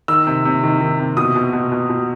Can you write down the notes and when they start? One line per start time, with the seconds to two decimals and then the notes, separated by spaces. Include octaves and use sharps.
0.08 D#3 E6
0.27 C3
0.45 C3
0.63 D#3
0.81 D#3
0.99 C3
1.17 B2 D#6
1.36 B2
1.53 B2
1.72 B2
1.89 B2